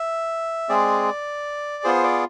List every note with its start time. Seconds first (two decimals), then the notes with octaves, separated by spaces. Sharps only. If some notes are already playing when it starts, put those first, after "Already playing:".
Already playing: E5
0.69 G#3 C4 G#4 D5
1.84 B3 F4 G#4 C5
2.04 D5